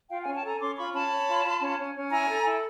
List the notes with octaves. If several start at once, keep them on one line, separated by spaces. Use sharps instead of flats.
F4 F5 G5
F#5 G#5
C#4
G5 A5
A4 G#5 A#5
C#4 C6 D6
F4 B5 C#6
C#4 A5 B5
C#5
F4
F4
C#4
C#4
C#4
E4 G#5 A#5
A4
E4